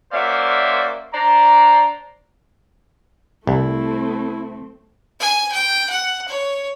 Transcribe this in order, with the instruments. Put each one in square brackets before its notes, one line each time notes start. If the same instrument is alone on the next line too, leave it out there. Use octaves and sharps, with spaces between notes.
[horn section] A#3 C#4 F#4 C5 D5 E5
D4 C5 D5 A#5
[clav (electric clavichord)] C2 [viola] A3 C4 [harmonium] E4
[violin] G#5
G5
F#5
C#5